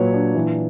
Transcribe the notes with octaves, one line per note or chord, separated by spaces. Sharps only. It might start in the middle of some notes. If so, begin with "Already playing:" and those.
Already playing: A#2 F#3 B4 C#5
D4
E3